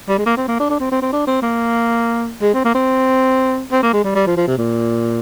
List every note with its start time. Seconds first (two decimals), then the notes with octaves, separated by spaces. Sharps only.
0.09 G3
0.18 G#3
0.26 A#3
0.37 C4
0.48 A#3
0.59 D4
0.70 D4
0.80 C4
0.92 C4
1.02 C4
1.12 D4
1.27 C4
1.42 A#3
2.42 G#3
2.54 C4
2.65 A#3
2.75 C4
3.72 C4
3.83 A#3
3.93 G#3
4.04 G3
4.15 G3
4.27 F3
4.37 F3
4.48 C3
4.58 A#2